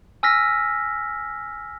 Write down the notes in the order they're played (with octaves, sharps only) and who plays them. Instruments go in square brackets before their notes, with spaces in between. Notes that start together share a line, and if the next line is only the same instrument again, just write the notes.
[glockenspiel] G#5 E6 F6 A#6 B6